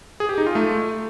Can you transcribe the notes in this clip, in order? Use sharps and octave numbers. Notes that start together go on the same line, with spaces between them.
G#4
G4
D#4
F4
A3